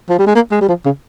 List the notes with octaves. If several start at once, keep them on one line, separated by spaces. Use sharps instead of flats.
F3
G3
G#3
A#3
G#3
G3
F3
C#3